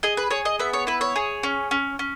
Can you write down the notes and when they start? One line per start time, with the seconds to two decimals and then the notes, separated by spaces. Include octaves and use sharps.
0.03 G#4 D#5
0.17 B4
0.31 G#4 C#5
0.45 D#5
0.59 B3 E5
0.73 C#5
0.87 E4 B4
1.01 C#5
1.16 G#4
1.43 C#4
1.71 C#4
1.99 C#4